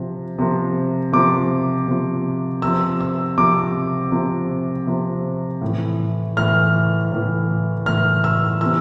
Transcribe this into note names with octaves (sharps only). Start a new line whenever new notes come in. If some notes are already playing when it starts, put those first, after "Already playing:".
Already playing: C3 F3
C3 F3
C3 F3 D6
C3 F3
C3 F3 E6
E6
C3 F3 D6
C3 F3
C3 F3
A2 E3
A2 E3 F6
A2 E3
A2 E3 F6
E6
C3 E3 E6